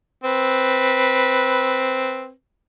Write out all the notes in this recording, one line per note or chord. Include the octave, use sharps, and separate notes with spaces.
C4 B4